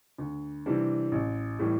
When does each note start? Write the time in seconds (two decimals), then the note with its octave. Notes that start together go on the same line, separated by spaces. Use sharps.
0.18 D2
0.66 C3 E3 G3 D4
1.12 A1
1.59 A2 E3 G3